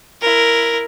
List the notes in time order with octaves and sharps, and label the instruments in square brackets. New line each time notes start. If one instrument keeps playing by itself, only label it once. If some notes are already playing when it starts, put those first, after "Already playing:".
[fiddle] E4 A#4